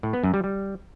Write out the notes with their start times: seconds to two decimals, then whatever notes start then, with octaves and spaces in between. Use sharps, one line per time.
0.03 A2
0.13 B3
0.23 F#2
0.34 G3
0.44 G3